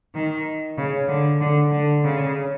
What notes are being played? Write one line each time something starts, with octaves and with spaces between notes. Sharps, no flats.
D#3
C#3
D3
D3
D3
C#3